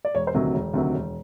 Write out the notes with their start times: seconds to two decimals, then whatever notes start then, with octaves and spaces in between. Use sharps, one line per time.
0.05 D5
0.15 E1 C#5
0.27 C5
0.34 D2 C3 D#3 F#3
0.54 E1
0.74 D2 C3 D#3 F#3
0.94 E1